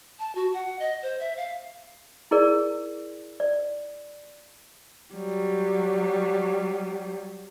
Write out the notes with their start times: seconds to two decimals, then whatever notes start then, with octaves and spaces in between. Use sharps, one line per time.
0.19 A5
0.35 F#4
0.54 F#5
0.79 D#5
1.02 C5
1.20 E5
1.37 F5
2.31 E4 G#4 A#4 D5
3.40 D5
5.14 F#3 G3